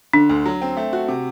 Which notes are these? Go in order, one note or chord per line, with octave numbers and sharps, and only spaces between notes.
D3 D4
D2
F#3
C4
A3
F#4
C3